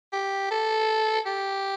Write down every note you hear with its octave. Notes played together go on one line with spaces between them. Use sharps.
G4
A4
G4